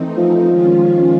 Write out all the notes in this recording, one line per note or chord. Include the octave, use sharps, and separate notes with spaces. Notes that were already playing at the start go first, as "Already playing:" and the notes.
Already playing: E3 A3 C4 D#4
F3
D#3 G#3 C#4 F4